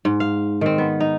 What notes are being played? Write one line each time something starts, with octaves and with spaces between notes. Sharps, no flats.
G#2
F5
D#3 C4
B3
D#4